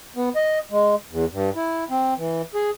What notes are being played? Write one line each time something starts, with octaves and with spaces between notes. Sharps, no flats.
B3
D#5
G#3
E2
G2
E4
C4
E3
G#4